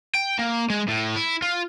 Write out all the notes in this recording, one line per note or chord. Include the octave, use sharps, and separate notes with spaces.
G5
A#3
G#3
A2
E4
F4